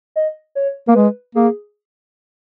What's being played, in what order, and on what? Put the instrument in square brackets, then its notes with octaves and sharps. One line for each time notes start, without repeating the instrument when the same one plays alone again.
[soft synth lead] D#5
C#5
[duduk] A#3 [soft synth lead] A#4
[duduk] G#3 [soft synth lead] B4
[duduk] A#3 [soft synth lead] G#4